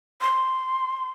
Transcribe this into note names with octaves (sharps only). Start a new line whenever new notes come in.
C6